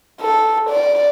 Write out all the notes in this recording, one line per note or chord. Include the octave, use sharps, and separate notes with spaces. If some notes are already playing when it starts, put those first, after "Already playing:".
A4
D5